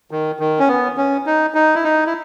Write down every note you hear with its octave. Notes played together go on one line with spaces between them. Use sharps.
D#3
D#3
C#4
B3
C#4
D#4
D#4
E4
D#4
E4